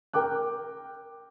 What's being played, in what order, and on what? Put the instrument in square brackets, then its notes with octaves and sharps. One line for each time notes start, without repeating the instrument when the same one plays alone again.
[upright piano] A#4 G5 D6 F#6